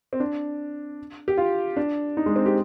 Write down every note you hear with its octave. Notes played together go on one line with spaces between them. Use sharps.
C4
D4
G4
F4
D4
D#4
G#3
C4
G4